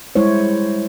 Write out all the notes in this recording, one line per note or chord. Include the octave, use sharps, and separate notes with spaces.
G3 G#3 E4 C5 C#5